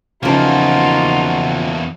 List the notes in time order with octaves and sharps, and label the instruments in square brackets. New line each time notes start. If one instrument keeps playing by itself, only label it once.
[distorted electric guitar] E2 A#3 [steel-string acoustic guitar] C#3 F3 [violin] D#4 F4 [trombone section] F#4